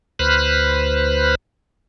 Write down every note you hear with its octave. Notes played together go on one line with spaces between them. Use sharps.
D2 B4 C5 B5 F6 F#6